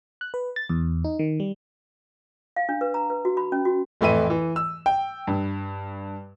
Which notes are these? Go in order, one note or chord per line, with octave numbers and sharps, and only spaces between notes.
F#6
B4
A6
E2
D#4
D#3
G3
F5
D4
B4
A#5
B4
F#4
B5
C#4
F#4
F2 A2 E3 E5 D#7
E3
E6
G5
G2